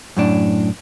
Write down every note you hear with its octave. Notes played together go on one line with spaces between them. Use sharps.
F#2 A2 D4